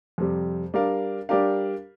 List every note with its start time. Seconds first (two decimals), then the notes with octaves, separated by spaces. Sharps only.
0.18 F2 C3 G3
0.74 G3 D4 A#4 F5
1.29 G3 D4 G4 A#4 F5